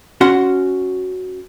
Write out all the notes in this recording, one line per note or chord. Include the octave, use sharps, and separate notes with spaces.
C#4 F#4 F#5 C6